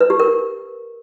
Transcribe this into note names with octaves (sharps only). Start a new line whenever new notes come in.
B4
G4
A#4